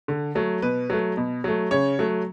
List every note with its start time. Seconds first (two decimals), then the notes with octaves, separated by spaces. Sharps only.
0.08 D3
0.35 F#3 A3
0.62 B2 B4
0.90 F#3 A3
1.17 B2
1.44 F#3 A3
1.71 C#3 C#5
1.99 F#3 A3